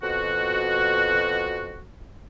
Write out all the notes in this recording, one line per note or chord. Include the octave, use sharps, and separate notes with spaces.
F2 B2 F#4